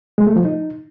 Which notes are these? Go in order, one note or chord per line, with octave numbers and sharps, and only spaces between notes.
G#3
A3
F3
D#4